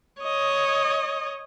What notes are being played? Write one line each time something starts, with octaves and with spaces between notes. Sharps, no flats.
C#5 D#5